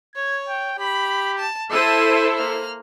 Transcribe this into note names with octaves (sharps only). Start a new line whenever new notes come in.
C#5 G#6
G5
G4 B5
A5
E4 A4 C5 A5 E6 D#7
A#3 F6